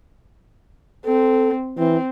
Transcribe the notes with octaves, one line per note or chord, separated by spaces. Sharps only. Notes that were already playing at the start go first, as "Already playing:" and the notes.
C4 A4
E3 C4